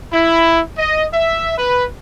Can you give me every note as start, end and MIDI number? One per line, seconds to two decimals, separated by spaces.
0.13 0.60 64
0.78 1.05 75
1.14 1.52 76
1.58 1.84 71